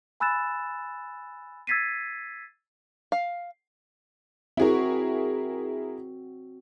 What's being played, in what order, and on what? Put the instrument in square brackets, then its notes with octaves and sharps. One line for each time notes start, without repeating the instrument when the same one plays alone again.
[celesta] G#5 B5 E6 F#6 A6 E7
E6 G#6 A6 B6 C7 D#7
[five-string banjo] F5
[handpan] C4 F#4 [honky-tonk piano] E4 G#4 A#4